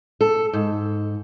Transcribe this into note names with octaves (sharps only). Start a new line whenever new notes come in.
A4
G#2